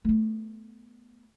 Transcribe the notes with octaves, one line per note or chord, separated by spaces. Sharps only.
A3 B3